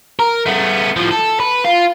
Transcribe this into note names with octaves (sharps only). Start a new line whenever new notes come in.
A#4
A3 B3
A2 F3
A4
B4
F4